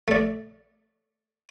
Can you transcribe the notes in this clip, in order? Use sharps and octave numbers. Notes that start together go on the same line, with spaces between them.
A3 D5